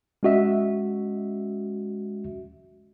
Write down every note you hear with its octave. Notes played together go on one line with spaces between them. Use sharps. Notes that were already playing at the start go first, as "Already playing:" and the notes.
G#3 C#4 F#4 D#5 E5